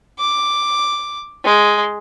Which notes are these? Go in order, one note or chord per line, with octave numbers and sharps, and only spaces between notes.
D6
G#3